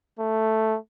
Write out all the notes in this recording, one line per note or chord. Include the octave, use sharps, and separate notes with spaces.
A3